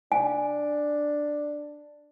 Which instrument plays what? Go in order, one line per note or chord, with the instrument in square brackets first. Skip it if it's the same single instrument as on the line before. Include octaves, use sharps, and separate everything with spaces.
[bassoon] D4 [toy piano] G#5